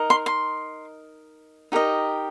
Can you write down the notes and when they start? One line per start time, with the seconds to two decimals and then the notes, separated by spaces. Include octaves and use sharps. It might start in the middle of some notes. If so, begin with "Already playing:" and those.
Already playing: D#4 A#4 D#5
0.10 C6
0.26 C6
1.72 D#4 G4 A#4 D#5